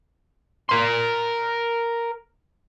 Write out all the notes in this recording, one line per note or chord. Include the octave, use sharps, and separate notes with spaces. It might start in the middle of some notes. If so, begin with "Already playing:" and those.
A#4 C6